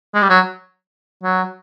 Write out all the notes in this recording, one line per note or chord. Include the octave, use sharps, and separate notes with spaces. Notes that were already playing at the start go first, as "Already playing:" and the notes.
G#3
G3
F#3
F#3